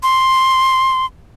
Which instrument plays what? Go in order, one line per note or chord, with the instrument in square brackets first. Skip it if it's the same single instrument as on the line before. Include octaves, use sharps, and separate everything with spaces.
[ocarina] C6